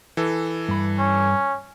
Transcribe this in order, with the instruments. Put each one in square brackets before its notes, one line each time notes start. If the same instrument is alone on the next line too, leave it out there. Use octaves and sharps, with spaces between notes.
[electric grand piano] E3 A4
[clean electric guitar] G2 B5
[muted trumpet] C#4